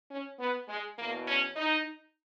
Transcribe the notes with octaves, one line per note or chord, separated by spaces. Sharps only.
C#4
B3
G#3
E2 B2 A#3
C#4
D#4